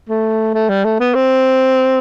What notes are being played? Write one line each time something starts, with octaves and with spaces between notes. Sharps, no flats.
A3
A3
G3
A3
B3
C4